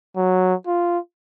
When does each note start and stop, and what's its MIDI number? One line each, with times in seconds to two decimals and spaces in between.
0.16 0.54 54
0.67 0.98 65